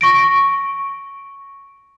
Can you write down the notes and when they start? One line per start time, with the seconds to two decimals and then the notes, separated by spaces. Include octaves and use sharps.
0.01 C#6 A#6 D7